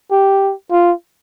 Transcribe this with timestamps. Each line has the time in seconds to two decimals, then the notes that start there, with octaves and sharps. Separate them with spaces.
0.11 G4
0.71 F4